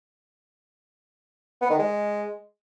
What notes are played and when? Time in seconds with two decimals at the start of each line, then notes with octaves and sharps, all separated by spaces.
1.61 B3
1.70 D#3
1.78 G#3